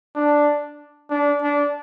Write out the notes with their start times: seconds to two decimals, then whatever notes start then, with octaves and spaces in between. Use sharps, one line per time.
0.15 D4
1.10 D4
1.42 D4